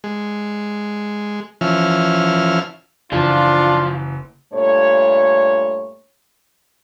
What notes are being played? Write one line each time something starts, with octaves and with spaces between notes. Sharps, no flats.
G#3
E3 F3 C#4 E5 F6
F#1 E3 F3 D4 F4
G2 A#2 A3 C#5